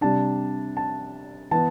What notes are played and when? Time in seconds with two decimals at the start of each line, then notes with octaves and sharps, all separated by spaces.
0.01 C3 G3 D4 A5
0.77 A5
1.51 E3 B3 A5